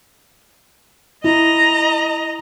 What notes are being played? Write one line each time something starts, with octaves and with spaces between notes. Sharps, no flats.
E4 D#5 A#5